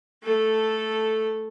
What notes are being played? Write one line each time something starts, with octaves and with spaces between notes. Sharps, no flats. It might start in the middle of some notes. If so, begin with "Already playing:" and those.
A3 A4